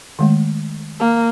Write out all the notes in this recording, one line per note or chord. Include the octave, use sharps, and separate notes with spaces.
D#3 G#3 A3
A#3